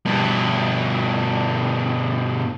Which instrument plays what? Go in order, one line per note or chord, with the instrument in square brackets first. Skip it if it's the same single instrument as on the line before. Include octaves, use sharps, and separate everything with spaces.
[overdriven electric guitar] G2 B2